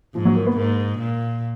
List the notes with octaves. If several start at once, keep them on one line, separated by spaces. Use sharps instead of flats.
G#2 F3
F#3
A#3
B3
G#2 A#3
A#2